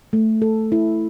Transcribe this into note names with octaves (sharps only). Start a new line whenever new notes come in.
A3
A4
E4